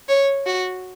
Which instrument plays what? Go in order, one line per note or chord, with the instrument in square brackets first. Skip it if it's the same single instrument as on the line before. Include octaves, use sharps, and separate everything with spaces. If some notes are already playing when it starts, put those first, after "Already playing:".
[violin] C#5
F#4